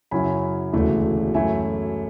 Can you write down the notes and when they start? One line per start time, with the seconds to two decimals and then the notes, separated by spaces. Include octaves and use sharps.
0.11 F#2 C#3 F#3 C#4 E4 G#5 B5
0.73 E1 D2 C#3 E3 A3
1.34 F#2 E3 A3 E4 E5 G#5